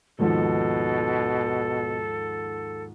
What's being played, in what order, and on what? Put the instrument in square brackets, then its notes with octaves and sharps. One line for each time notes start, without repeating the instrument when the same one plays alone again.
[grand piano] D#2 G#2 F3 [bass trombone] B2 [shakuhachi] A4